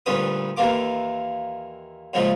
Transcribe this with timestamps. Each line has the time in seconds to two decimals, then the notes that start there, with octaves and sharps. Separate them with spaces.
0.06 D2 G2 A#2 C#4 B4 D#6
0.57 D#2 E3 A#3 F4 D6
2.14 A#2 C#3 F3 G#3 A3